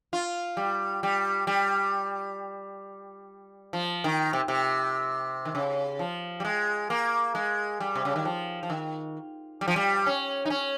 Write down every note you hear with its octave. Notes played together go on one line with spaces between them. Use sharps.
F4
G3
G3
G3
F3
D#3
C3
C3
D#3
C#3
F3
G3
G#3
A#3
G#3
G3
C3
C#3
D#3
F3
F3
D#3
G3
F3
G3
C#4
D#4
C#4